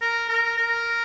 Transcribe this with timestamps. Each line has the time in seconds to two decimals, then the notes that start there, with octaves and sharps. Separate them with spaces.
0.01 A#4
0.29 A#4
0.58 A#4